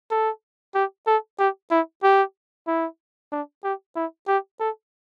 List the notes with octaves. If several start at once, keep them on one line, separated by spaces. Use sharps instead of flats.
A4
G4
A4
G4
E4
G4
E4
D4
G4
E4
G4
A4